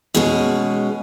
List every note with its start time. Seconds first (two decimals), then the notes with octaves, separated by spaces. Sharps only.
0.14 B2 G#3 C#4